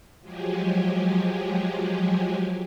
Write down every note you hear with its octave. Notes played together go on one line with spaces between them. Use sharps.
F3 F#3 G#3 G4 G#4